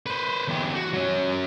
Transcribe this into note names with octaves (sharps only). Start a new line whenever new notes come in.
B4 C5
E2 G4
F#4
F#3 C#4